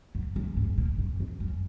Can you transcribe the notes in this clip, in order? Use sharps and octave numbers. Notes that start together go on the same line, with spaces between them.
F#2
F#2
G#2
A#2
F#2
F2
F#2